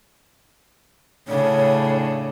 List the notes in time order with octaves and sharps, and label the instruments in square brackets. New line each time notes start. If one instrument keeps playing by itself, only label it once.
[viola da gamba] A2 C#3 D4 [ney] C#5